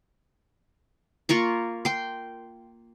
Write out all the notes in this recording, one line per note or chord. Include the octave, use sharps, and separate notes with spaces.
A#3 F4 A#4 C#6
G5 C6